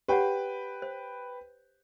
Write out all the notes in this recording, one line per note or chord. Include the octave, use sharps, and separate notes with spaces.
G4 B4 C#5 F#5 G5
C5